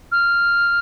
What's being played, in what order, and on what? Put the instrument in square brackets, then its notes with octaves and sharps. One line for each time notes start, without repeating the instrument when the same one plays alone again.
[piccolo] F6